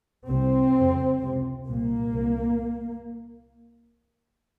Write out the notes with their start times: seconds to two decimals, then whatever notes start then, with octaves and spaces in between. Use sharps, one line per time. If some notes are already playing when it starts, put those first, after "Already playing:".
0.28 C2 C3 C4
0.75 F2 C#3
1.20 C#2 C3
1.66 C2 A#2 A#3
2.12 C2